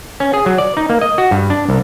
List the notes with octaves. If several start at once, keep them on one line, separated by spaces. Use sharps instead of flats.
C#4
G#4
F#3
D5
D#4
A#3
D#5
F#4
G2
D4
C2